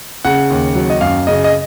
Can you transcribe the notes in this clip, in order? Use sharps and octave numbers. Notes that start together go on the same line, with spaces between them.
C#3 F#5
D#2
F#3
D#5
F#2 F5
C#3 D#5
D#5